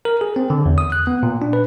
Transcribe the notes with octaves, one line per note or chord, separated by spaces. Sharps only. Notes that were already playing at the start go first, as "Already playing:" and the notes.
A#4
G#4
C4
D3
E2
D#6
F#6
B3
A#2
D4
B4